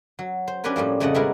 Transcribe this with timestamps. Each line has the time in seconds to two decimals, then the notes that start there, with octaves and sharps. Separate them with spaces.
0.19 F#3
0.48 C5
0.64 C#4 D4 G4 A#4 B4 C#5
0.76 A2 F3 G3 A#3
1.00 F2 C#3 A3 D5 D#5 F#5
1.14 B2 G3 G#3 E4 F#4 A#4